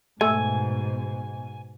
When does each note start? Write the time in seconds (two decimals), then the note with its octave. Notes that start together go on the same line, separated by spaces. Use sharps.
0.21 G#2 B2 A3 G#5